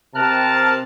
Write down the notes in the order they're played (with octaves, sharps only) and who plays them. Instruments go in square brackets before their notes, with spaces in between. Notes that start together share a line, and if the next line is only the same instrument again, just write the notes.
[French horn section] C3 [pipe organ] A#4 F6 F#6 [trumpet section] A5